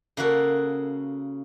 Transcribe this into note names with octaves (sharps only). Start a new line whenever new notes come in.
C#3 A#3 F#4 A4